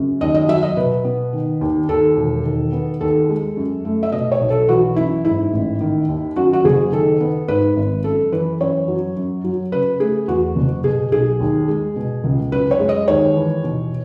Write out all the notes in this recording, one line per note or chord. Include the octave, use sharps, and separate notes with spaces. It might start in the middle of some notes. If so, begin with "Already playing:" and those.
Already playing: F#2 C#3
D#2 D#5
D#5
F#3 E5
D#5
B2 B4
B3
D#3
D#2
D#2 A4
E1
D#3
B3
D#2 A4
G#3
F#2
A3
E5
B2 D#5
C#5
B1
A4
E3 F#4
F#2 E4
G#2 E4
A1
D#3
D#2
F#2 F#4
F#4
F#1 G#4
D#3 A4
B3
G#2 B4
G#1
F#2 A4
E3 B4
F#2 C#5
F#3
F#2
F#3
C#3 B4
A3 G#4
E2 F#4
F#1
B2 G#4
B1 G#4
D#2
G#3
B2
C#2
F#2 B4
C#5
G#3
D#5
D#2 C#5
E3
B2